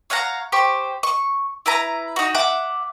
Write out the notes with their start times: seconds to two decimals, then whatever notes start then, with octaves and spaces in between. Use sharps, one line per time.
0.10 C#5 F5 F#5 A#5
0.52 G4 C5 C#6
1.03 C#6
1.66 E4 B4 A#5
2.16 D#4 F#4
2.35 E5 F#5 D6